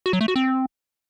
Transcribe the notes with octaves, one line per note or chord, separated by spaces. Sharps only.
F#4
F#3
A3
F#4
C4